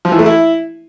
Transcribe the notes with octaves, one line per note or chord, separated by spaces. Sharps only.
F3
E3
A3
E4